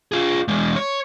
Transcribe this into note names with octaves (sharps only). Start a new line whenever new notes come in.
F4 G#4
E2 G#3
C#5